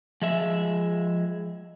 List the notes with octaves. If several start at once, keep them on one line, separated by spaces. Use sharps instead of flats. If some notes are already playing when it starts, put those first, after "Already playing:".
F3 G#3 E5